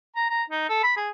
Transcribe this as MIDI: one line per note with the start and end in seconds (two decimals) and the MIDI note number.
0.16 0.30 82
0.30 0.43 82
0.50 0.65 63
0.69 0.81 69
0.84 0.92 83
0.97 1.10 68